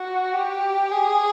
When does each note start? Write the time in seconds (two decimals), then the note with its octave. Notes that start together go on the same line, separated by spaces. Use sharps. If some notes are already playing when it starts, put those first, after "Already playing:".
Already playing: F#4
0.33 G4
0.92 G#4